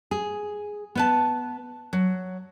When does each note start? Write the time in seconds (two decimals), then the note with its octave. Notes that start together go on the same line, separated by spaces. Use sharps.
0.11 G#4
0.95 B3 B4 A5
1.93 F#3